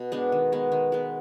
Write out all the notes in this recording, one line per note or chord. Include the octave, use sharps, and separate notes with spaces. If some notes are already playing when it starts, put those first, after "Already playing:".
Already playing: B2
G#3 B3 D4
D#3
G#3 B3
D#3
G#3 B3